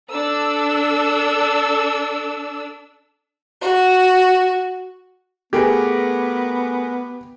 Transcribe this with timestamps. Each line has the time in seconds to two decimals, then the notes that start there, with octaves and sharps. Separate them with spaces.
0.11 D4 A4 E6
3.61 F#4
5.53 A3 B3 G4 G#4 A#4 B4